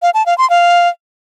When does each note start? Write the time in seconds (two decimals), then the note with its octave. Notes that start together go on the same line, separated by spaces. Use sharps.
0.02 F5
0.14 A5
0.26 F5
0.38 C6
0.50 F5